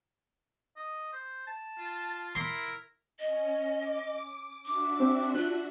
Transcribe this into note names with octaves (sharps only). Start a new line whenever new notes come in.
D#5
C5
A5
F4
E4 A#4 C6
C#4 D#5
D6
D4 F#4 E5 D6
C4
F4 F#6